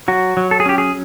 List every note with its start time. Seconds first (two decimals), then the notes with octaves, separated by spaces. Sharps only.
0.08 F#3 F#4
0.37 F#3
0.51 A4
0.60 G#4
0.66 C#4 G4
0.78 G#4